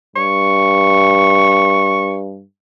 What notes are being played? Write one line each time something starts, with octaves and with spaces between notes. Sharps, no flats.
G2 C#6